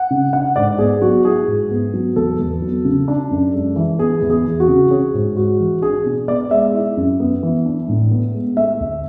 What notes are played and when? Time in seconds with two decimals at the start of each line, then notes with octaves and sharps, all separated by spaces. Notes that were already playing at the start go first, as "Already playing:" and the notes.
Already playing: F#5
0.10 C#3
0.33 D4 F#5
0.56 G#2 D5
0.78 B3 G#4
1.02 F#3 F#4
1.25 E4 G#4
1.48 G#2
1.71 B3
1.94 F#3
2.16 E2 A4
2.39 E2
2.62 F#3
2.85 C#3
3.08 D4
3.31 F#2
3.54 G#3
3.76 E3
3.99 B3 G#4
4.22 E2
4.30 G#4
4.45 E3
4.60 F#4
4.68 C#3
4.90 C#4 G#4
5.14 G#2
5.37 G#3 F#4
5.59 E3
5.82 D4 G#4
6.05 B2
6.28 B3 D5
6.51 G#3 E5
6.74 E4
6.97 F#2
7.20 B3
7.43 E3
7.66 D4
7.88 A2
8.11 B3
8.34 G#3
8.57 A3 E5
8.80 D2